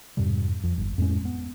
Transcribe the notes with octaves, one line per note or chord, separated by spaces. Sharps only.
F2 G#2 C3 G3
F2
G1
F2 A2 G#3 C#4
B3